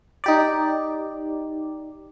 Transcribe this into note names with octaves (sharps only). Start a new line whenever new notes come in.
D#4 G4 D5